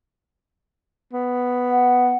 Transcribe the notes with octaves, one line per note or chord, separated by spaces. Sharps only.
B3
F#5